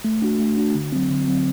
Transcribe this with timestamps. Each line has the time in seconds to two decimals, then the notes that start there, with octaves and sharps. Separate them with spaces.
0.04 A3
0.22 D4 F#4
0.39 A3
0.57 D4 F#4
0.75 D3
0.92 F#3 C4
1.10 D3
1.28 F#3 C4